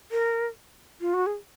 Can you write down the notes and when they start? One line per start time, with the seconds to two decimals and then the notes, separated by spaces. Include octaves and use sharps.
0.11 A#4
1.01 F4
1.14 F#4
1.26 G#4